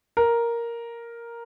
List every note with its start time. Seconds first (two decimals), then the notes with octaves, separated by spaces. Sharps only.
0.17 A#4